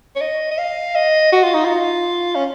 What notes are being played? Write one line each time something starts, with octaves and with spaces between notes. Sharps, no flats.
C#5
D#5
D#5
F5
D#5
F#4
F4
D#4
F4
C#4